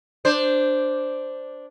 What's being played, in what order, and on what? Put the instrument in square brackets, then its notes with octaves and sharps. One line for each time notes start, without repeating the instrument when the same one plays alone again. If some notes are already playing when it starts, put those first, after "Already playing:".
[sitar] D4 C5